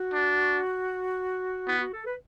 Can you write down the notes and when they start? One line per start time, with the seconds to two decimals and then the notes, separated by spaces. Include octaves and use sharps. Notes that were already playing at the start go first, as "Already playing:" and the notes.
Already playing: F#4
0.13 D4
1.68 B3 E4
1.80 F#4
1.93 A4
2.05 B4